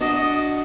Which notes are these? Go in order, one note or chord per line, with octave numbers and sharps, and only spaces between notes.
D4 F#4 D#5
D#5